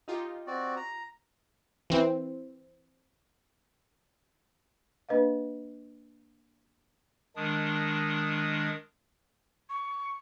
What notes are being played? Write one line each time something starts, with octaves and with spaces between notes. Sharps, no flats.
D#4 F4 G4
C4 F#4 D5
A#5
E3 C4
A#3 D4 B4 D#5 F5
D#3 G#3 D4 D#6
C#6